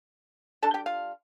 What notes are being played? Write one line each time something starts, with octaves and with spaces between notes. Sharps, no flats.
G3 D4 A4 A5
G4 G5
F4 F5